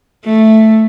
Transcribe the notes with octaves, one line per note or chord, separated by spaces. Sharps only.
A3